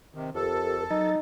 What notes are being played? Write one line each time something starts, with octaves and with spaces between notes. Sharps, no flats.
C3 D#3
F2 G4 A4 A#4
F#3 D#4 A6